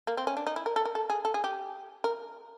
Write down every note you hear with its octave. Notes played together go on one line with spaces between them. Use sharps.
A#3
C4
C#4
D4
D#4
E4
A#4
A4
A#4
A4
G#4
A4
G#4
G4
A#4